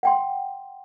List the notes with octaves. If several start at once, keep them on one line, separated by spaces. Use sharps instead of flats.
F#5 G5 C6